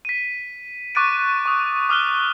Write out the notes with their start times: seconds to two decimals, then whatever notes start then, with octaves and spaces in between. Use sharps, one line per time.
0.05 B6 D#7
0.95 C#6 D6 F#6 A6 D7 D#7
1.46 C#6 D#6
1.89 D6 D#6 F6 F#6 G7